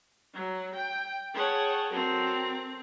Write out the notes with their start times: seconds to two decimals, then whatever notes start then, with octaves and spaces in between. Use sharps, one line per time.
0.34 F#3
0.75 G5
1.34 G#4 C#5 F#5 G5 A5
1.92 F#3 C4 A4 A#4